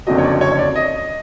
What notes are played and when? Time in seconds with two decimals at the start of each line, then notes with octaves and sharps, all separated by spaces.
0.07 F#1 F2 D3 F#3 D#5
0.18 C#5
0.24 D5
0.41 C#5
0.59 D5
0.75 D#5